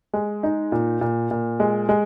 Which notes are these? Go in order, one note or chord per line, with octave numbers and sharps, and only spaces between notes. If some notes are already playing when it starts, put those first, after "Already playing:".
G#3
D#4
A#2
A#2
A#2
G#3
G#3